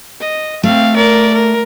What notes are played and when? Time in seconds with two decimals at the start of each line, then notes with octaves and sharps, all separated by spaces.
0.20 D#5
0.63 A3 C4 F5
0.96 A#4 D5
1.34 A#4